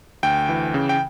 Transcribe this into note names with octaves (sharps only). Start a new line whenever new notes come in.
D2 G5
E3
C#3
G5